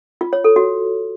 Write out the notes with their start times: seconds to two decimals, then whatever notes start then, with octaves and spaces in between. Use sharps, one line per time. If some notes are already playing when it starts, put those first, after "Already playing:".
0.21 F4
0.33 C#5
0.44 A4
0.56 F#4